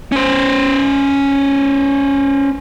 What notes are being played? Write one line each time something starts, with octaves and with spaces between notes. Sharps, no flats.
C#4 C5